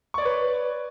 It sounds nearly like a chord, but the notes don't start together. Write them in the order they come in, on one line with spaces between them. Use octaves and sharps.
C#6 D5 C#5 B4